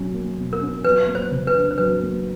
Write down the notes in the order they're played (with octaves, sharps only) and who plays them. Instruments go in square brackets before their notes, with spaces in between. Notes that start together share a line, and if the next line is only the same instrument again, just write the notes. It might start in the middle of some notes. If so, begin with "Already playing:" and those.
Already playing: [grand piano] B2 F#3 C#4
A#3
B2
[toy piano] A#4
[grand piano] C#4
[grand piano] F#3 [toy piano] B4
[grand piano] A#3
[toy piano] C5
[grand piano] C#3
[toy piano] B4
[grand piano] D4
[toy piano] C5
[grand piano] F#3 [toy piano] B4
[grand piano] A#3